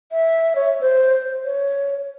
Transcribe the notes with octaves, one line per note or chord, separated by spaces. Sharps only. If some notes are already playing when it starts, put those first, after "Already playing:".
E5
C#5
C5
C#5